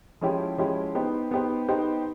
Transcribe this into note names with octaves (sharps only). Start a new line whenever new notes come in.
F3 G#3 C#4 E4 G4
F3 G#3 C#4 E4 G4
B3 D#4 G4 C5
B3 D#4 G4 C5
B3 D#4 G4 C5